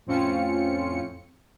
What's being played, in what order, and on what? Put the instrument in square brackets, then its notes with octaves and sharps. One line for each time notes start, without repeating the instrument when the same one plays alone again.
[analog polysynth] F2 A2 C4 C#4 F4 C#7